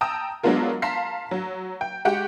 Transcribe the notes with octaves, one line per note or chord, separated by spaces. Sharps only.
G5 A5 A#5 D#6 E6
F#3 G#3 B3 D4 F4 A#4
F5 A5 A#5 C6 B6 C7
F#3
G5
G#3 F#4 G4 F#5 G5